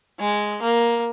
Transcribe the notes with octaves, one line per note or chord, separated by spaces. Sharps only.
G#3
A#3